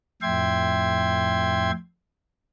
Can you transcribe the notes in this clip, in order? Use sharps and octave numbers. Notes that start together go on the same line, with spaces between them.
F2 A2 E5 G5 C6 G#6